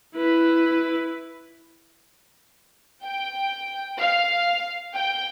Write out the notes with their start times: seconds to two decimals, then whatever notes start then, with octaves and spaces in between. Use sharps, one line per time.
0.15 E4 B4
3.04 G5
3.99 F5
4.94 G5